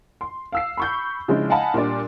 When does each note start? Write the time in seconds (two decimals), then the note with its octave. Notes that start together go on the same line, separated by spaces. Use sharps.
0.21 C6
0.52 F5 E6 C7
0.77 B5 C#6 G6
1.28 C#3 F3 G#3 D4 E4
1.50 D#5 F5 F#5 G#5 A5 B5
1.74 A#2 G3 D4 D5